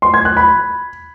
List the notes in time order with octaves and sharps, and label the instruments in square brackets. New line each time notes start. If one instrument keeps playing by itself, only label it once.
[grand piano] C6
G#6
F#6
B5